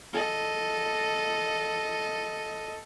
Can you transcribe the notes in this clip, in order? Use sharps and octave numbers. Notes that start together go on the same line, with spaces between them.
A4 D#5